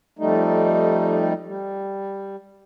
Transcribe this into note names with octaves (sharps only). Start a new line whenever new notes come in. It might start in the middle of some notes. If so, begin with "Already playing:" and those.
F2 G3 A3 D#4
G3